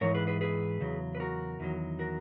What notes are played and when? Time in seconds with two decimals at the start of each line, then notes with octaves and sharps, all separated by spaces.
0.01 G#2 E3 A#4 C#5
0.14 G#4 B4
0.27 G#4 B4
0.41 G#4 B4
0.81 E2 C#3 F#3
1.15 B4
1.20 F#4 A#4
1.60 E2 D#3 F#3
1.99 F#4 A#4